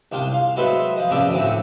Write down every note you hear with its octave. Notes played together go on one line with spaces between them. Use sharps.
C2 D4 F4 G5 A5
F5
F#3 G#3 A4 B4 C5 E5
F3 D#5
E2 C#3 F3 D5 E5 A5
D2 A2 D3 A3 C4